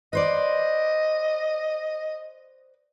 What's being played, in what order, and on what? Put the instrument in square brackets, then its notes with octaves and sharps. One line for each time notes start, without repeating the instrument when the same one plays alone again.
[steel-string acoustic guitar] B4 C5 D5 [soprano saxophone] D#5